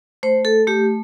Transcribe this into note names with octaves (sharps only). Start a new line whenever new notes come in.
A3 C5
A4
A3 G4